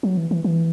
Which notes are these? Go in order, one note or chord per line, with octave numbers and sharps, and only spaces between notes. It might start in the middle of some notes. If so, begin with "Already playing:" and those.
F#3
E3
E3
E3